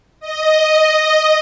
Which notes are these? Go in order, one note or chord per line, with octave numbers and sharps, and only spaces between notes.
D#5